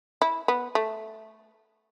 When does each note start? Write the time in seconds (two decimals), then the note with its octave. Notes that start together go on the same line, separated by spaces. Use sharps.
0.22 E4
0.48 B3
0.75 A3